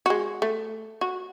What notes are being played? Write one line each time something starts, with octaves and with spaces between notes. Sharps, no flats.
G#3 F#4
A3
F#4